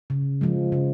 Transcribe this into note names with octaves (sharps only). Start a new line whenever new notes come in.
C#3
F3 G#3
C#3